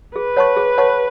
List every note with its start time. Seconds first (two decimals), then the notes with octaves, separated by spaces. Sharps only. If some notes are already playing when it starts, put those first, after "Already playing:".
0.16 G#4 B4
0.37 C#5 F#5 A5 C#6
0.56 G#4
0.78 C#5 F#5 A5 C#6